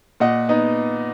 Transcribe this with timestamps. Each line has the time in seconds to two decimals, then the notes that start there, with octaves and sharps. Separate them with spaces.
0.20 A#2 D#5 F#5
0.49 B3 D#4